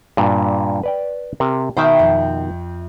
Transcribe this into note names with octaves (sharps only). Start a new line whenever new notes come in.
G2 A#2
B4 D5 G5
C3 A#4
B2 D#3 C5 E5 G5
F2